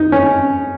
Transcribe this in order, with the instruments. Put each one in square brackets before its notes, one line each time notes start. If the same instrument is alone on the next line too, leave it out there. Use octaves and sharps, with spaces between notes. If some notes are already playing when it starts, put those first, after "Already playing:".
Already playing: [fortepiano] D#4
C#4